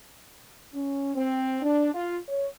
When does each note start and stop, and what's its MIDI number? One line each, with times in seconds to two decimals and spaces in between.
0.73 1.13 61
1.14 1.62 60
1.62 1.93 62
1.93 2.16 65
2.27 2.47 73